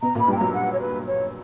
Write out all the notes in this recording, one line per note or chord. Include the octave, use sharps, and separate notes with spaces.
B2 B3 A#5
A#2 A#3 B5
G2 G3 G5
F#3 A#5
F#5
C#5
B4
C#5